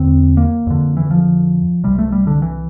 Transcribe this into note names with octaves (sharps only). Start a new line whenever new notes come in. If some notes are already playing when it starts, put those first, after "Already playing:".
Already playing: E2 D3 C4
A#3
F2 D3
E3
F3
C2 C3 G3
A3
G3
D3
E3